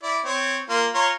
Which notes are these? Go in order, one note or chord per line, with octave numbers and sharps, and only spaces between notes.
E4 D5
C4 C#5
A#3 F4
F4 C#5 A#5